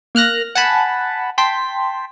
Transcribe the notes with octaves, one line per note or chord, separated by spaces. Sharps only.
A#3 F6 F#6 A#6
F#5 G#5 A5 B5
G5 A5 C6 B6